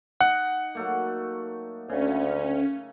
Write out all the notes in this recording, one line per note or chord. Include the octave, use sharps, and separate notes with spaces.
D#4 F#5
F#3 A3 A#3
D2 C#3 C#4